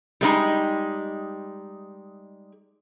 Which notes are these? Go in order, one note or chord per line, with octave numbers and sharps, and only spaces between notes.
G3 G#3 D#4